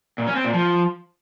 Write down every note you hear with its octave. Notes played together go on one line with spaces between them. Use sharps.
A#2
C#4
C4
A#2
F3